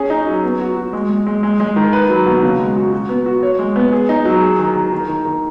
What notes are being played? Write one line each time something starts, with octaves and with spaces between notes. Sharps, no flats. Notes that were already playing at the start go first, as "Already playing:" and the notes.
Already playing: C#4 G#4
D#4
F#3
B3
F#4
F#4
G#3
G#3
G#3
G#3
G#3
D#3
B4
F#3
B2
C#3
G#3
F#4
F#4
B3
F#4
C#5
G#3
B3
G#4
D#4
F#3
G#4
D#3
D#3
D#3
D#3
D#3